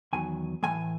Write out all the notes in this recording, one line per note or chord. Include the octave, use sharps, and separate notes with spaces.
E2 D#3 F#3 G#5
A2 E3 G#3 G#5